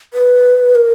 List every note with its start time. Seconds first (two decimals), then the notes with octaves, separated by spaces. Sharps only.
0.14 B4
0.75 A#4